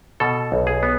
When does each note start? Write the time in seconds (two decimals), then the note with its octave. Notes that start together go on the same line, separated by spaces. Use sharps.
0.20 B2 A4
0.52 B1
0.67 G#4
0.83 B3